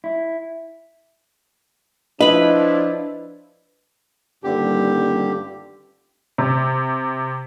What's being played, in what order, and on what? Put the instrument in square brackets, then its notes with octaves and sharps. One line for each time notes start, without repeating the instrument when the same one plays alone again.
[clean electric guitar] E4
[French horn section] F3 D4 [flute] E4 [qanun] B4 B5 [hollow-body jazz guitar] D#5
[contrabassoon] D#1 [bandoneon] G2 D3 G4
[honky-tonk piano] C3